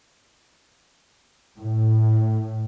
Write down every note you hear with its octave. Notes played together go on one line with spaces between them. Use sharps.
A2